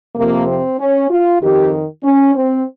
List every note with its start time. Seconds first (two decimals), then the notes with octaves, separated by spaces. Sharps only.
0.15 F2 C3 F3 A#3
0.47 C4
0.79 C#4
1.10 F4
1.41 F2 D#3 G4
2.04 C#4
2.35 C4